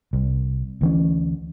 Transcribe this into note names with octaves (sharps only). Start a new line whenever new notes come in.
C2
D2 E3 C#4